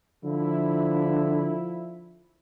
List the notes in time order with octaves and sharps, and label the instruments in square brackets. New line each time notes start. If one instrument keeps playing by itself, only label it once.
[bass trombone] D3 [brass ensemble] F3 E4